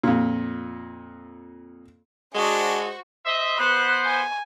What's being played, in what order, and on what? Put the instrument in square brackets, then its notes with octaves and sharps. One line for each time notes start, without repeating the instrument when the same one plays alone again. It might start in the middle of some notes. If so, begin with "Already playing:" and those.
[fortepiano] F2 A#2
[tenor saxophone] G#3 [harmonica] D4 G#4 [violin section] F#4 C5 C#6
[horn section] C5 D#5 E5
[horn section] B3 C5 [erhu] F#6
[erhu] G#5